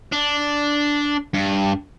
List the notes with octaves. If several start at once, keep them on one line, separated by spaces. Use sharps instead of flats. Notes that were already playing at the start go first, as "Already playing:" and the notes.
D4
G2